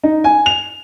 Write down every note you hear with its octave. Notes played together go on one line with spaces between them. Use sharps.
D#4
G#5
F7